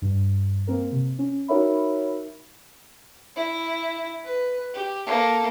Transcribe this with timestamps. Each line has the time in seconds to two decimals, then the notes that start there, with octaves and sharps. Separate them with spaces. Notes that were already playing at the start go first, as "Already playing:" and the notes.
0.02 G2
0.67 A#3 C4 A#4
0.92 C3
1.19 C#4
1.48 D#4 F#4 A#4 C#5 E5 B5
3.36 E4
4.24 B4
4.75 G4
5.07 A#3 A4